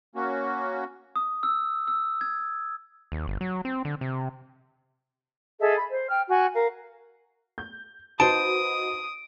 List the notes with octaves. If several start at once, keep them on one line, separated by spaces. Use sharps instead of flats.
A#3 C#4 F#4
D#6
E6
E6
G#6
D#2
G1
F#3
C4
D3
C3
G#4 A4 D#5 E5
B5
C5
G5 F6
F#4 G#5
A#4 F5
G6
D#4 F#4 B4 C5 A5 D#6 D7